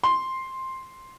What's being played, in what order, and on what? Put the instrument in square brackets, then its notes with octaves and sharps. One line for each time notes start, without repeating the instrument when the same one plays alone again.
[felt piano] C6